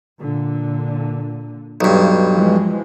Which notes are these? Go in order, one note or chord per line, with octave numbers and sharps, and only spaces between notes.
A#2 D3
B1 G2
E3 F3 G#3